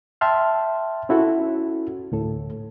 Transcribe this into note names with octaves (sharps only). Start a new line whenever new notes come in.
E5 G5 A5 C6 F6
C#4 E4 F#4 A4
D2 A2 A4